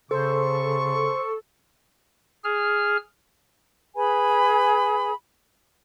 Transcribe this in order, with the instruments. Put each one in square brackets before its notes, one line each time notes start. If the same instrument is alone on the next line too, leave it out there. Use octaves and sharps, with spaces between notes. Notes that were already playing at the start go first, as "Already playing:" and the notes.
[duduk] C#3 [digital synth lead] A4 [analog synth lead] C5 [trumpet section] C#6
[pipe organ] G#4 F6
[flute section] G#4 B4 G#5 B5